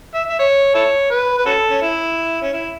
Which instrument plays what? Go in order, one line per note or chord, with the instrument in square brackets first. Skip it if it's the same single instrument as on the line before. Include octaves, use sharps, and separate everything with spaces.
[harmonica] E5
E5
C#5
E4 A4 C#5
B4
B4
C#4 F#4 A4
C#4
E4
C#4
E4